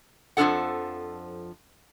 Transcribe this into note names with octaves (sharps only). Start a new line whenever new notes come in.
F2 F3 F#3 D4 A4 F#5